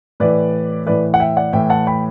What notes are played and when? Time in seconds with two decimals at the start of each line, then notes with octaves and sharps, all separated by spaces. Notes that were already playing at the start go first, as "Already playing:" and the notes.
0.20 A2 E3 B4 D5
0.86 A2 E3 B4 D5
1.14 F#5
1.20 E5 G5
1.37 D5 F#5
1.53 A2 E3 E5 G5
1.70 F#5 A5
1.87 G5 B5